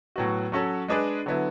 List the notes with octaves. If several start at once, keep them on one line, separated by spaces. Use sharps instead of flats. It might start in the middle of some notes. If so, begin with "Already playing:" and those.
A2 F#3 B3 F#4
F#3 C#4 F#4 A4 C#5
G#3 D4 G#4 B4 D5
D3 F#3 B3 E4